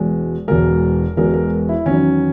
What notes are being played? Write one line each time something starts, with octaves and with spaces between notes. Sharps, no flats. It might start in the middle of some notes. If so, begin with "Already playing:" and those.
Already playing: E1 E2 B2 G#3
E1 E2 B2 G#3 A#4
E1 E2 B2 G#3 A#4
A#4
E4
E2 D#3 F#3 C#4